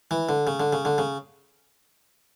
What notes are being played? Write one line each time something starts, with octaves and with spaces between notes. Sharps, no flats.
E3
D3
C#3
D3
C#3
D3
C#3